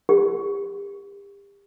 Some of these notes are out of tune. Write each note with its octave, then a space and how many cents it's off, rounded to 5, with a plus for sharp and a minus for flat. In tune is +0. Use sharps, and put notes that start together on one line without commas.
G4 +40